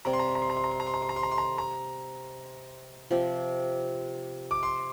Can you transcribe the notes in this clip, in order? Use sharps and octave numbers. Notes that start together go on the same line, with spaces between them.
C3 G3 C4 A#5
C6
A#5
C6
A#5
C6
A#5
C6
A#5
C6
A#5
C6
A#5
C6
A#5
C6
A#5
C6
A#5
A#5
C3 F3 C4 G4
D6
C6